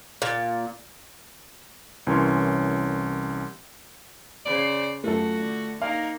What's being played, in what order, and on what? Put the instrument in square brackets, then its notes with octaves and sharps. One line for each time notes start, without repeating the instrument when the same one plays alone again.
[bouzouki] A#2
[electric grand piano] C2 E3 C#4 A#4 C#5 C6
[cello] C#3 C5 [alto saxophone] D5
[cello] F#2 [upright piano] A3 F4 A4 [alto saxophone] F#4
[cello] D3
[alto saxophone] A#3 [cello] D#4 A#4 [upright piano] F5